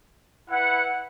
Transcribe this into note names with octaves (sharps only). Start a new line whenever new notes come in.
E4 B4 F#5